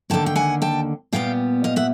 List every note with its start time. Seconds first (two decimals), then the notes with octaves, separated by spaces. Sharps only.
0.10 D#2 D3 F#3 A#3 G5 A5
0.26 G5
0.36 F#5 G#5
0.62 G5 A5
1.12 A#2 G3 B3 F5 G5
1.64 D#5 F5
1.76 E5 F#5